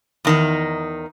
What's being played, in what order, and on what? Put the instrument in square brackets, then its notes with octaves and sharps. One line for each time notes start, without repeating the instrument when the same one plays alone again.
[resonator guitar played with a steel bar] E2 D#3 D#4